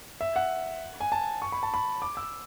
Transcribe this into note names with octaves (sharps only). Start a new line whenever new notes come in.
E5
F#5
G#5
A5
C#6
B5
A5
B5
D6
E6